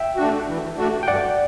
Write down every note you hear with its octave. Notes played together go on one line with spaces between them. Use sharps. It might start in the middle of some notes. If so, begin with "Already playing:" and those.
Already playing: E5 G5
A3 D4 F#4
E3
A3 D4 F#4
G5
G2 D5 F#5